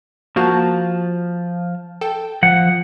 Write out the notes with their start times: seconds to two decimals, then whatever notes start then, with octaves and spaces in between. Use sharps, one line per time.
0.36 F3 A#3 F#4 A5
2.01 A4 G5
2.43 F3 F#5